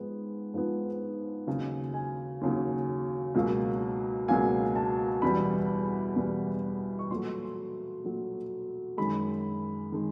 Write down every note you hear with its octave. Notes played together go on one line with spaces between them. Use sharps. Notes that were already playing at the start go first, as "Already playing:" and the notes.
Already playing: G#2 F3 G#3 B3
G#2 F3 G#3 B3
D#2 C#3 F#3
G#5
D#2 C#3 F#3
C#2 B2 F#3 A#3
C#2 B2 F#3 A#3 G#5
A5
E2 B2 G3 B3 B5
E2 B2 G3 B3
C#6
A#2 F#3 A3 C6
A#2 F#3 A3
F#2 D#3 G#3 B5
D#3 G#3